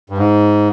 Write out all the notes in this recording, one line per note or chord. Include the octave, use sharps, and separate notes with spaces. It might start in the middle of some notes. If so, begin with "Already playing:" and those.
G2
G#2